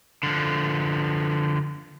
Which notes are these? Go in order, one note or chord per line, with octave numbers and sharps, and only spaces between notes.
D3 F3